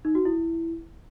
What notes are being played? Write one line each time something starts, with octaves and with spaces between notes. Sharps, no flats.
D#4
F#4
E4